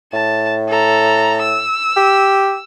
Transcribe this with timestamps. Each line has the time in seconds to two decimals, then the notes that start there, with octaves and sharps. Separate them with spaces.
0.13 A2 A5
0.68 A4 A#5
1.42 E6
1.96 G4